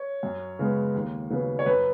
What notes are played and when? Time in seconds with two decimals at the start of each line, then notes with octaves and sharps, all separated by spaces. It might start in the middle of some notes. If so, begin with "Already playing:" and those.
Already playing: C#5
0.23 F#2
0.59 C#3 G#3 B3
0.94 D#2
1.30 C#3 F#3 B3
1.59 C#5
1.66 F#2 B4